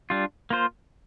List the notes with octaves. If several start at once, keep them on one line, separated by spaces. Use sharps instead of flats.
G3 D4 F4
A#3 F4 C5